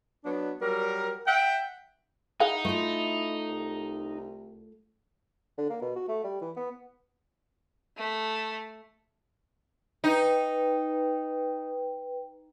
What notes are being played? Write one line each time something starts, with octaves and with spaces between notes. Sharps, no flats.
F#3 B3 D4
F#3 G3 F#4 A#4
E5 F#5 G5
D#4 E4 G#4 F5 F#5
A3 E4 F4
C2
D3
A#3
B2
F#4
A3
G3
E3
B3
A3
D#4 B4 G5